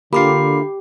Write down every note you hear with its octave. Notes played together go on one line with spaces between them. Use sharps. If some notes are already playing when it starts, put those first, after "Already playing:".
D3 A#3 F4 G4 B5 D6 C7